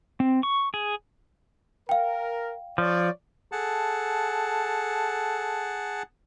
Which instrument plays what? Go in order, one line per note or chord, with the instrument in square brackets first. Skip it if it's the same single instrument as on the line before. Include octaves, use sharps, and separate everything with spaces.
[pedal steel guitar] C4
C#6
G#4
[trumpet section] A#4 [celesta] F5 G5
[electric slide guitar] F3 [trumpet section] C#5 D5
[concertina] G#4 F#5 A5 [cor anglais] A4